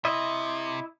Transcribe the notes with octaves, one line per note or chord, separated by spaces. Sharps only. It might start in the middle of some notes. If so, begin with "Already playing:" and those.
C3 E4 D#5 E5